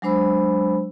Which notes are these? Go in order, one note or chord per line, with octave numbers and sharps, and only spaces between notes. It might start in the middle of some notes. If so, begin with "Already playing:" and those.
F#3 G#3 D4 C5 B5 E6